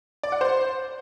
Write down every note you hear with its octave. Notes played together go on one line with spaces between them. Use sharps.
D5
F#5
C5